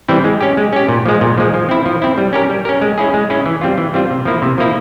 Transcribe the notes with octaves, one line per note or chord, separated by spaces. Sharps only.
E3 G3 C4 E4
G#3
C#4 G4
G#3
C#4 G4
A#2
F3 G#3
A#2
F3 G#3
F3
C4 E4
F3
C4 E4
G3
C#4 G4 A#4
G3
C#4 G4 A#4
G#3
C#4 E4 G#4
G#3
C#4 E4 G#4
E3
G3 C4 F4
E3
G3 C4 F4
C3
F3 A#3 E4
C3
F3 A#3 E4